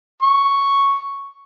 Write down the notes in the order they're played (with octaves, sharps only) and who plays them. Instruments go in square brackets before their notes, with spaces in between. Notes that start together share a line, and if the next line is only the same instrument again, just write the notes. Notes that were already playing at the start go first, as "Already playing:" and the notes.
[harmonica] C#6